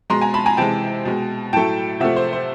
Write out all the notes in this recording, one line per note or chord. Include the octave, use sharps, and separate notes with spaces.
B2 G#3 A#5 C6
G#5 A#5
A5 B5
G#5 A#5
C3 E3 G#3 G5 A5
B2 G#3
A2 F#3 A3 G5 A5
C3 F3 A3 E5 F#5
C5
C5